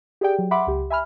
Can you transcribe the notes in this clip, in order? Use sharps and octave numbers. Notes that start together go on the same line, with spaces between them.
G4 G#4 D5 G5
F#3
E5 F#5 B5 C6 D6
C#2 G4
E5 G#5 B5 F6